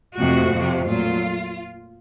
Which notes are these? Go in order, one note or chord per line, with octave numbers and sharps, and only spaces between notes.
F2 C3 F3 A3 F#4
F2 C3 F3
A#2 F#3 A3 F4